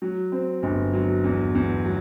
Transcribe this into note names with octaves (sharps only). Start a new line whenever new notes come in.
F#3
C4
G1
F#3
E2
E2
F#3